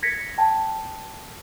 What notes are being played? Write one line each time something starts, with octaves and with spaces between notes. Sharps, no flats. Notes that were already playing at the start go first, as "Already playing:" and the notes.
G#6 A#6 B6 C#7
G5 A5